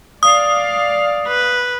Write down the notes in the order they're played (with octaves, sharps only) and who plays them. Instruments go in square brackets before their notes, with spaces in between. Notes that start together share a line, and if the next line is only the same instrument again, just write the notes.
[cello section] D5 F5 [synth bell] D#6
[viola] B4